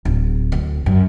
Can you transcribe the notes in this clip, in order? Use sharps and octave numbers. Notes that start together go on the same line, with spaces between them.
D1
D2
F#2